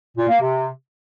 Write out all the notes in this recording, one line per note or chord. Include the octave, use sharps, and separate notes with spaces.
A#2
A#3
C3